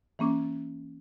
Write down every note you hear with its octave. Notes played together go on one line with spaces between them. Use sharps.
E3 A#3 C#4 D6